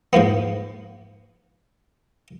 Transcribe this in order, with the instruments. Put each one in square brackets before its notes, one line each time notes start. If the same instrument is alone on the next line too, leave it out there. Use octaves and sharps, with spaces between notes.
[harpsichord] G#2 F3 A#3 B3